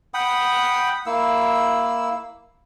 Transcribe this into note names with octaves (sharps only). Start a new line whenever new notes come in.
F#5 G5 B5 D#6
A#3 E4 E6